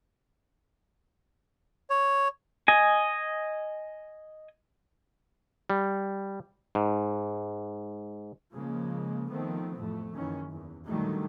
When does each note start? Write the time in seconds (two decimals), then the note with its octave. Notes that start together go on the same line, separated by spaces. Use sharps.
1.90 C#5
2.68 D#5 G#5
5.70 G3
6.75 G#2
8.54 C#3 F3 G#3 A#3
9.30 D#3 F3 A3 B3 C4
9.77 A1 F2 A3
10.15 F#1 D#3 E3 C#4
10.52 E2
10.86 A#2 D3 D#3 F#3 G3 A3